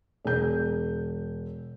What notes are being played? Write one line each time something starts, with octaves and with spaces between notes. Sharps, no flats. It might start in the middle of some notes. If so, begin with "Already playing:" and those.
E1 G6